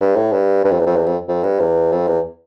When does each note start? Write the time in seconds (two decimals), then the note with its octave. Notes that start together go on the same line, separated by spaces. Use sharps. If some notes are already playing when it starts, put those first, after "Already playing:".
0.01 G2
0.16 A2
0.33 G2
0.64 G2
0.71 F2
0.80 E2
0.86 F2
0.96 E2
1.06 F2
1.29 F2
1.43 G2
1.60 E2
1.92 F2
2.07 E2